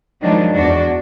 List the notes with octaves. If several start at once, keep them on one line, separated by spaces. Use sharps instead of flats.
D#3 F3 F#3 G#3 D4
E2 D4 F#4